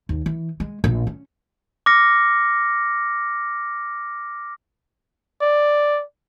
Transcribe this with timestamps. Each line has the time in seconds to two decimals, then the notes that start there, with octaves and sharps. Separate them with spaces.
0.09 D#2
0.26 E3
0.60 G#3
0.84 A#1
1.07 C#4
1.86 D6 F6 A#6 C#7
5.41 D5